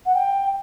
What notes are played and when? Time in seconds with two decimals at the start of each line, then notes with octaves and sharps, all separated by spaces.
0.05 F#5
0.14 G5